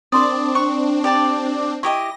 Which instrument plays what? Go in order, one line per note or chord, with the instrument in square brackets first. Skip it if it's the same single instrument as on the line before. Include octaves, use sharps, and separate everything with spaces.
[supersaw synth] C4 D4 [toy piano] A#4 C6 D#6 [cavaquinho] D5
[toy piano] C5 [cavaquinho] C#6
[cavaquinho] G4 D5 A5
[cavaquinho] E4 G4 D#5 [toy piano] C#6 [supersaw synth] A#6